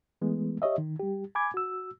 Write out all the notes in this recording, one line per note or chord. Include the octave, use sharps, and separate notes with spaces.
E3 G#3 A3 B3
G4 C#5 D#5 E5
D#3
G3 G4
G#5 B5 D6 G#6
F#4 E6